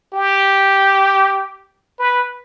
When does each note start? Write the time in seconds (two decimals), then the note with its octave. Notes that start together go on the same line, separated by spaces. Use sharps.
0.13 G4
1.99 B4